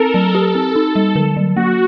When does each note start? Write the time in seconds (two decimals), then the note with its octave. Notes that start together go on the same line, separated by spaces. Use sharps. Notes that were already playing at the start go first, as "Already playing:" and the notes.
Already playing: C4 A4 A#4
0.14 F#3
0.35 G4
0.55 C4
0.76 D#4
0.95 G3
1.16 D3
1.36 F#3
1.56 A#3 F#4